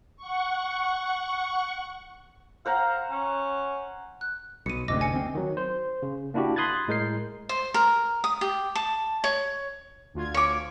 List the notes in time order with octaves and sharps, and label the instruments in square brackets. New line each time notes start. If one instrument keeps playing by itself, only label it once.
[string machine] F#5 C#6
[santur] C5 F#5 A#5 [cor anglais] F5
[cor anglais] C#4
[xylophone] F#6
[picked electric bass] B1 [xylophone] C#7 D#7
[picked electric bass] F#1 D2 C3 [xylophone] D#5 D6 A#6
[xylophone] G#5 C#7
[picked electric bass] D2 C4
[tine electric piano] D#3 F#3
C5
C#3
A#3 D4 E4 F#4 G4
B5 C6 D#6 F#6 G#6 A6
A2 G#3 A#4 G6 C7
[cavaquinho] C5
A#4
D#6
G4
A5
C#5
[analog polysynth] D2 F4 G#6
[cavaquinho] C#5 D6